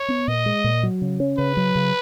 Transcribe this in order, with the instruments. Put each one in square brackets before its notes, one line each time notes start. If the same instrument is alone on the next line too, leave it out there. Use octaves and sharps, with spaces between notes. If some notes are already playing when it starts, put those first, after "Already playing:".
Already playing: [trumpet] C#5
[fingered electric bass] B3
[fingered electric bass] A#2 [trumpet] D#5
[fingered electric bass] G#3
A#2
F#3
C#3
C#4
[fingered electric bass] C#3 [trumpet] B4
[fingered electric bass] F#3
C#3